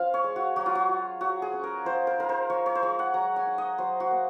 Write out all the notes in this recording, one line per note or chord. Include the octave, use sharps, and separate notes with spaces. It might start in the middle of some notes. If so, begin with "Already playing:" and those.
Already playing: F3 C#4 F4 F5
C#5
G#3
F#4
F#3 F#4
F4
F#4
F4
F#3 F#4
G#4
C#4
A#4
F3 C5
A#4
D#4 A#4
C5
F3 C#5
C#5
C5
G#3 C#5
F#5
F#3 A#5
G#5
D#4
D#5
F#3 C5
F#4
A#3